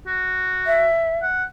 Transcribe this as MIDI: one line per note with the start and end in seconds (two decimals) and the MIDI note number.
0.06 0.88 66
0.67 1.19 76
1.22 1.44 78